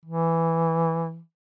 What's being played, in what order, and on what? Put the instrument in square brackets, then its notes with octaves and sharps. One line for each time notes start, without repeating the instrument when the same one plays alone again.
[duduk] E3